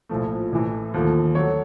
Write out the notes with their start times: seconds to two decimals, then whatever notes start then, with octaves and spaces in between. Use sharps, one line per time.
0.09 A#1 A2 F3 A3
0.52 A1 A2 E3 A3
0.94 D#2 D3 F3 A3
1.35 D3 F#3 A3 C#5